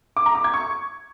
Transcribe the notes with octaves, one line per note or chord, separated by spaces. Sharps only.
D6
A#5
D6
G#6
C#6